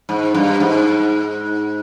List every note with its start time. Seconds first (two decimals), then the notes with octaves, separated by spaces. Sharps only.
0.09 G#2
0.34 G2
0.60 G#2